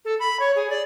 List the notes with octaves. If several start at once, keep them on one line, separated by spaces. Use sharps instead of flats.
A4
B5
C#5
G#4
D5